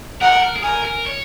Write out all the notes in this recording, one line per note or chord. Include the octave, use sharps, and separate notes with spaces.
A#4 F#5
A#4
G#4
A#4 G#5
A#4
C#5